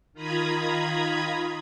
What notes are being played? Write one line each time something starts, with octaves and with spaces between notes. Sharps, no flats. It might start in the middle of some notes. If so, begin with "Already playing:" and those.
D#3 F4 A#5 B5 D#6 G#6